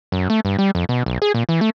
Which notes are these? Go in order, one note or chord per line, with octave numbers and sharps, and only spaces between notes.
F#2
A3
G2
G3
F2
B2
B1
G#4
A#2
E3
A3